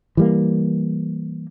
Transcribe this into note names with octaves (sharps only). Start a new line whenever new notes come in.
E3 G3 A#3